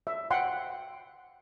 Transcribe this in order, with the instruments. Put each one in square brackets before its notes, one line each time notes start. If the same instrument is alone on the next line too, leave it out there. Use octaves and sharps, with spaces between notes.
[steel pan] E5
F#5 G5 C6